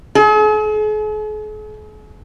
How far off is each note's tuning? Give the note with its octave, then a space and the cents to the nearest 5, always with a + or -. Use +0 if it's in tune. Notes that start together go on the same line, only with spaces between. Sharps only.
G#4 +45